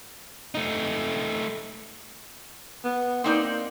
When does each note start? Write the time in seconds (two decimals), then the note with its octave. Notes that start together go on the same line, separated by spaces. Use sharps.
0.55 A3 D#4
2.84 B3
3.24 A#3 C4 D#4 D5